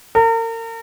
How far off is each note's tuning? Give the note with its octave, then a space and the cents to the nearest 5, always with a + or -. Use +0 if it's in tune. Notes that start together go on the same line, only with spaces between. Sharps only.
A#4 -40